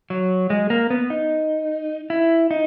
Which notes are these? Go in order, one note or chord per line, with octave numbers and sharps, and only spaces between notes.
F#3
G#3
A#3
B3
D#4
E4
D#4